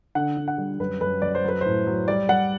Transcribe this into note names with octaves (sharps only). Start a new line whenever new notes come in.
D3 F#5
D3
F#5
G3
F#2 B4
F#2 B4
F#2 D5
C5
F#3 B4
A2 C5
F#3
G3 D5
G3 F#5